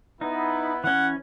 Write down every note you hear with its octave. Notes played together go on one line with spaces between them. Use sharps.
B3 D#4 E4
E3 C#4 F#5